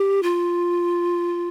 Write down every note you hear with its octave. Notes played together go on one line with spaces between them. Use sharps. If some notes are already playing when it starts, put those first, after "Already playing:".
Already playing: G4
F4